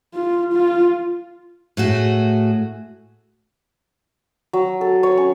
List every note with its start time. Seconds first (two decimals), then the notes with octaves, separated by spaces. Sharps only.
0.14 F4
0.53 F4
1.77 A2 A3 F#4 G#4
4.53 F#3
4.81 A4
5.03 C#5
5.17 C#4